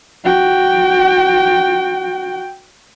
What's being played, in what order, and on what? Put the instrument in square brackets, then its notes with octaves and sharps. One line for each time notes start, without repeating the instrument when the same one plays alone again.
[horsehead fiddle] F#4 G5